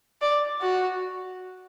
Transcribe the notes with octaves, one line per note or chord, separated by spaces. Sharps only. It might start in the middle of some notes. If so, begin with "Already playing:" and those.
D5
F#4